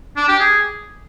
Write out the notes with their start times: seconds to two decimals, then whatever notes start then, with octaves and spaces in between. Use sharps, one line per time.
0.16 D4
0.28 G4
0.40 G#4